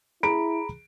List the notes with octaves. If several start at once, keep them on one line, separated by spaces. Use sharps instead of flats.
E4 G#4 A#5 B5 D7